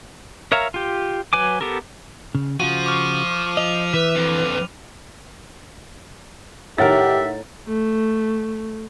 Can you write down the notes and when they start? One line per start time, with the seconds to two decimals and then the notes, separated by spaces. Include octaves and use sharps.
0.52 A#4 C#5 E5 F5 A#5
0.74 F4 G4
1.33 F#3 B4 G#5 D6
1.61 B3 G4 A4 A#4
2.35 C#3
2.60 C#3 F3 F4 F#4 D#7
2.86 C#6 D6 F6
3.57 D#5 F7
3.94 E3 B4 E5
4.16 F2 D3
6.78 A2 D#3 G4 A#4 E5 F#5 A6
7.68 A3